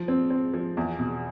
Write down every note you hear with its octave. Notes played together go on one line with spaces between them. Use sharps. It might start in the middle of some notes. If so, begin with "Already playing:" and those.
Already playing: F3
C4
C4
F3
E2
B2